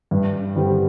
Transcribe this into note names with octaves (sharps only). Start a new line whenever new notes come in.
G2
D3 G3 C4 G4